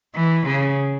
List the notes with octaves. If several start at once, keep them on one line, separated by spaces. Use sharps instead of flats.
E3
C#3